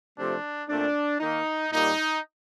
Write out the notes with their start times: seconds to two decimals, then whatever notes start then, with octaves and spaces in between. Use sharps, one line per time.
0.16 C3 F3 A3 C4 D4
0.68 A#2 A3 C4 D4
1.20 D#3 A#3 D#4
1.72 A#2 G3 A#3 D#4